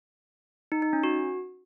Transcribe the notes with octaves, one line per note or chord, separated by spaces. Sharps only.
D#4
D#4
C#4
F#4